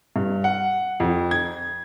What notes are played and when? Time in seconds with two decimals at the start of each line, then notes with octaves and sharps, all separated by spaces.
0.16 G2
0.44 F#5
1.00 F2
1.31 G#6